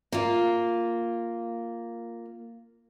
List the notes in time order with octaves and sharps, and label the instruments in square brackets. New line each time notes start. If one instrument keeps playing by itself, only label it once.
[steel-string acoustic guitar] A#3 F4